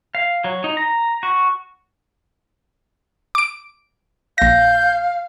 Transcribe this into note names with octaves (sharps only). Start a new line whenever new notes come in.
F5
F#3
D#4
A#5
F#4
D6 D7
A#1 F5 G6 A#6